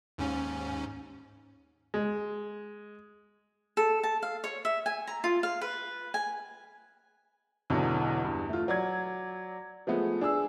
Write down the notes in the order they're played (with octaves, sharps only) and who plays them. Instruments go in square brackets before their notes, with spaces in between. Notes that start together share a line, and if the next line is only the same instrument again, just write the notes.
[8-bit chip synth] D#2 G#2 C#4
[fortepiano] G#3
[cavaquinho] A4
A5
F5
C#5
E5
G#5
A#5
F4
F5
B4
G#5
[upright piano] B1 E2 B2 D3 E3 F#3
E2 G2
A3 F4
F#3 D5 G#6
F3 G#3 A3 B3
D4 G#4 E6